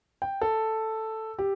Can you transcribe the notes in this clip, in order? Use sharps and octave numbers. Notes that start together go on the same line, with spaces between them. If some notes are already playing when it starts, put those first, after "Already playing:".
G5
A4
G4